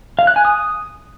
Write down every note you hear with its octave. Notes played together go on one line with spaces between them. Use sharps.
F5
F#6
G#5
D#6